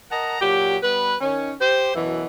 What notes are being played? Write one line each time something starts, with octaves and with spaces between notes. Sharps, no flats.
A#4 D#5 F#5 A5 A#5
A#2 F#3 G4
G3 B3 B4
D#3 C#4
G4 C5
F#2 B2 E3